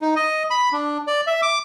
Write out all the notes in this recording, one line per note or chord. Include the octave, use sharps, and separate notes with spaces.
D#4
D#5
B5
D4
D5
E5
D6